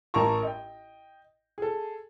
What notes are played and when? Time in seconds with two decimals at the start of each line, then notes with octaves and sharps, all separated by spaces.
0.14 A1 A#4 A5 A#5 C6 C#6
0.43 D#5 G5
1.58 G#4 A4